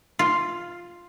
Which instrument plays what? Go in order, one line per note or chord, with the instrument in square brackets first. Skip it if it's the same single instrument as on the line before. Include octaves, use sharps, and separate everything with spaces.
[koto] F4